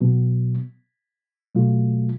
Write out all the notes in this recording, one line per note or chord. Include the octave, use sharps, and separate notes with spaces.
B2 F#3 B3
B2 F#3 A3 F4